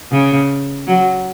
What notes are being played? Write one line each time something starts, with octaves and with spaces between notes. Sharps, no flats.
C#3
F#3